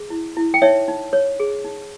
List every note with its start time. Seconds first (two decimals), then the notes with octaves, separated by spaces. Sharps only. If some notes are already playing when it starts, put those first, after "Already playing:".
Already playing: G#4
0.10 E4
0.37 E4
0.54 G5
0.62 D#4 C#5 E5
0.88 D#4
1.13 C#5
1.40 G#4
1.64 D#4